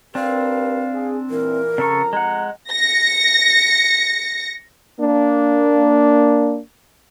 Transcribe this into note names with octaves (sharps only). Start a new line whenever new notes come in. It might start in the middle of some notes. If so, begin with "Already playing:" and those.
C4 D4 G4 A#4 B4 F5
G#4
A#2 E3 A#4
F2 C#3 A4 A#5 C#6
G#3 F#5
A#6 C#7
A#3 D4